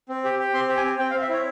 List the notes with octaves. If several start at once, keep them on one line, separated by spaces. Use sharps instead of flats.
C4
G4
G4
C4 C6
G4
G#5
C4
C4 G5
F5
C4
E5
E4 C#5